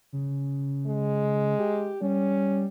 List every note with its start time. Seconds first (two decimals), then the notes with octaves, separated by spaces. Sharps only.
0.13 C#3
0.86 G#3
1.59 G4
2.02 G3 C#4